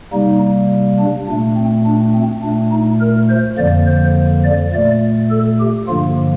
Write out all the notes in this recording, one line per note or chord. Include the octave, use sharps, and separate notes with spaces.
C3 G3 A#3 D#4
D4
A#2 A3 D4
C4
D4
C4
A#2 A3 D4
D#4
A#4
C5
F2 D3 F3 A#3 D5
C5
D5
A#2 A3 D5
A4
G4
G2 D3 F3 A#3 F4